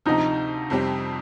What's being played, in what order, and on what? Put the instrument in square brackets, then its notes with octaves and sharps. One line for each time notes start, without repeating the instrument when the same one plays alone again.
[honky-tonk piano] D2 C3 F3 [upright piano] D#4
[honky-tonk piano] F2 C3 G3 C4 G4